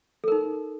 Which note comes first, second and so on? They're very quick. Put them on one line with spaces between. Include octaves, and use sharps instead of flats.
A4 A#4 D#4